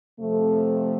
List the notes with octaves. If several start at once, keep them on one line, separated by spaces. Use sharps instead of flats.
F2 C3 F3 A3